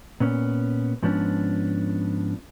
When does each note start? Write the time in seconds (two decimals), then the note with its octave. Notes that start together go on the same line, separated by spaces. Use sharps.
0.20 A#2 B3 C#4
1.03 G#2 F3 B3 C#4 D4